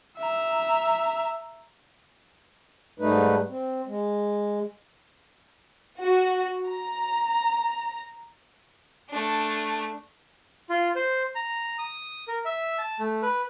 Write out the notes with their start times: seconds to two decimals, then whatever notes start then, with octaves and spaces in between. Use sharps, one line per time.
0.18 E5 A#5
3.00 G#2 G3 A3 D#4 B4
3.49 C4
3.87 G#3
5.99 F#4
6.68 A#5
9.10 A3 D4
10.70 F4
10.95 C5
11.35 A#5
11.78 D#6
12.28 A#4
12.45 E5
12.78 A5
12.99 A3
13.22 B4